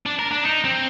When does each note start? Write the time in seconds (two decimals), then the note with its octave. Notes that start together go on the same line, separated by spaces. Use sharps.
0.06 D4
0.19 A#4
0.31 D4
0.46 D#4
0.65 C4